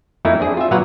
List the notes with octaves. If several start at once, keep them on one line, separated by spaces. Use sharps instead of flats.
F2 A3 A#3 D#4 E4
C4 D4 G#4
F4 E5
A#2 F#3 B4 F5 F#5 A#5